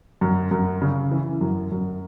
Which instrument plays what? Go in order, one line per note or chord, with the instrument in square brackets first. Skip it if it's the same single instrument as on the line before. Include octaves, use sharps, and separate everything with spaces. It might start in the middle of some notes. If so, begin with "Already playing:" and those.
[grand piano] F#2
F#2
C#3
E3
F#2
F#2